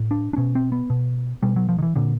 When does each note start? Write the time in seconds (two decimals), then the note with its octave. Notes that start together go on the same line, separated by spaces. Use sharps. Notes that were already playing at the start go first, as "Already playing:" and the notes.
Already playing: A2
0.11 D4
0.33 D4
0.37 B2 C#4
0.55 C4
0.72 B3
0.90 B2
1.43 B2 G3
1.56 F#3
1.69 F3
1.78 D#3
1.82 E3
1.96 A#2 D3